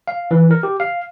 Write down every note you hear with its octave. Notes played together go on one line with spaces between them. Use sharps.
F5
E3
A#4
G4
F5